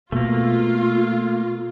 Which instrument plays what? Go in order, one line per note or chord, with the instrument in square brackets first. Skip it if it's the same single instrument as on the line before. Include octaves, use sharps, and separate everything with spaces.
[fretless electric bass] B2 [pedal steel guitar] A3 A#3 [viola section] F4